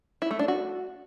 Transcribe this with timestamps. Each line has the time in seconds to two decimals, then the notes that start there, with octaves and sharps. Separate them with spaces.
0.22 E4
0.31 A3
0.39 D4
0.48 F#4